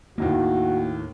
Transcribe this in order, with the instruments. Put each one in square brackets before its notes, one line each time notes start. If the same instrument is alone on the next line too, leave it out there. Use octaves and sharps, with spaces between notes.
[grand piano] D#2 A2 D#3 [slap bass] A#3 [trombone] F#4